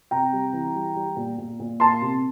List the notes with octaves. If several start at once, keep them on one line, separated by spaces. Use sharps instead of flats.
C3 G5 A#5
G3
E3
G3
G3
A#2
A#2
A#2
A#3 A5 C6
C3